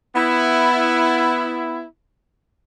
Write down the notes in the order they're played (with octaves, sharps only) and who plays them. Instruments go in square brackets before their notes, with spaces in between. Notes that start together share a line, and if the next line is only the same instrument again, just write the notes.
[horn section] B3 E4